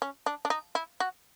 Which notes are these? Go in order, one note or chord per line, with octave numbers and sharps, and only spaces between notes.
C#4
D4
D4
D#4
E4
F#4